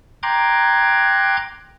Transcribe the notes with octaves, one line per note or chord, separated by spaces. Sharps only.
G5 A#5 C6 D6 F#6 G#6